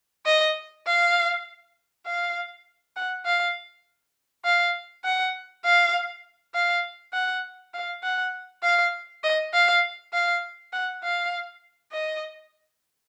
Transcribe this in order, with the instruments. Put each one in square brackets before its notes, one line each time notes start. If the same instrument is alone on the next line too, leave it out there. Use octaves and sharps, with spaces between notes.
[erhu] D#5
F5
F5
F#5
F5
F5
F#5
F5
F5
F#5
F5
F#5
F5
D#5
F5
F5
F#5
F5
D#5